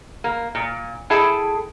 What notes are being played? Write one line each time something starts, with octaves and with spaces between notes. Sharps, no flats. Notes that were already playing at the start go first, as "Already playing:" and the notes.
A#3
A#2
E4 G#4 A4 E5 G5 A5